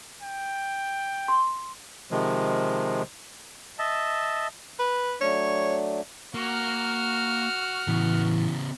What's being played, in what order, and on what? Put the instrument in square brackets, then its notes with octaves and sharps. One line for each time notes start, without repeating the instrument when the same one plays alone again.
[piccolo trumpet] G5
[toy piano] C6
[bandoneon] C3 D#3 F3 G#3
[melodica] D#5 E5 A5
[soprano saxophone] B4
[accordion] F#3 A3 D4 [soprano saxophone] C#5
[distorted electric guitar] A#3 [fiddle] F#4 F6
[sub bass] A2 [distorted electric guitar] C#3 B3 [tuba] E3